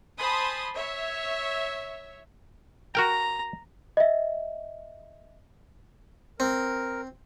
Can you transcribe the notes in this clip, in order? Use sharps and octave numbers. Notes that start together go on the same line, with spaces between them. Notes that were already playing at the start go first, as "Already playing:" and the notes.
C5 G#5 A5 B5 C6 D#6
C#5 E5
F#4 A#4 G5 A#5
D#5 E5
C4 A#4